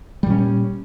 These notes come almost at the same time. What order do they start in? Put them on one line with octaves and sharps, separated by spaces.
G3 A#2 C#4